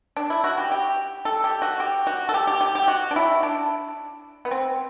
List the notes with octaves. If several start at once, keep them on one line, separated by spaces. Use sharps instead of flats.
D4
E4
F#4
G4
G4
A4
G4
F#4
G4
F#4
A4
G4
G4
G4
G4
F#4
D4
E4
D4
B3
C4